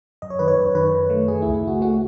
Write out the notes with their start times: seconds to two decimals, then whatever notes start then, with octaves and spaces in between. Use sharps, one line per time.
0.22 F#2 D#5
0.30 C#5
0.39 D#3 B4
0.48 C#5
0.57 F#2
0.75 D#3 B4
0.93 D#3
1.10 A3
1.28 A3 G#4
1.42 E4
1.46 C#2
1.54 E4
1.63 A3 F#4
1.81 A3 F#4